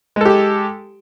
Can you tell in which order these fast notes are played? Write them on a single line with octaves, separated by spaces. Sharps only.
G#3 A4 G4